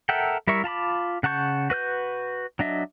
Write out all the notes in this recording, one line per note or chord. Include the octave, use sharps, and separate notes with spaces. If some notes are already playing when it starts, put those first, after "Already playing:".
A4 A#4 E5 F#5 G5
G3 E4 A#4 E5 C#6
F4 A5 B5 D6
C#3 F#5 A5 C#6 G6
F#4 B4 F6 G6
F#3 D4 D#5 E5